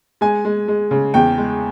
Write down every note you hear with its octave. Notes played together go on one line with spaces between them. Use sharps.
G#3 G#5
G#3
G#3
C#3
E2 G5
G#3